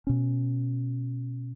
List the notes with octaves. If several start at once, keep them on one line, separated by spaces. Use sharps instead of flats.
B2 C#4